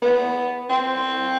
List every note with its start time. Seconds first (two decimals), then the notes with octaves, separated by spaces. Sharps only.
0.02 B3
0.70 C4